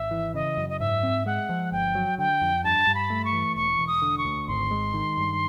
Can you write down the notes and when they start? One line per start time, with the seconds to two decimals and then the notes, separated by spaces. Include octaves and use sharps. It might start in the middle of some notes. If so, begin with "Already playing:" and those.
Already playing: G#1 E5
0.11 E3
0.34 C#3 D#5
0.57 F#2
0.70 D#5
0.80 G#2 E5
1.03 C4
1.26 G#3 F#5
1.49 F3
1.72 G1 G5
1.95 F#3
2.18 D3 G5
2.41 F2
2.64 G2 A5
2.87 G2
2.95 B5
3.10 A3
3.25 C#6
3.33 E3
3.56 E1 C#6
3.79 E1
3.87 D#6
4.02 D3
4.18 C#6
4.25 D2
4.48 G#1 C6
4.71 G#3
4.94 D#3
5.17 G2